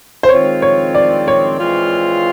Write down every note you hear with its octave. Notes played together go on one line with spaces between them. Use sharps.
C5
D#3 G#3 C4 F4 C#5
C#5
D5
C#5
E3 G#3 C4 F4